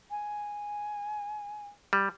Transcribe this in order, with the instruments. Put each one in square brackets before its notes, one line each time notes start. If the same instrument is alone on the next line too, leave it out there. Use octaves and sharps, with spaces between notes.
[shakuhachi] G#5
[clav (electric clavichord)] G3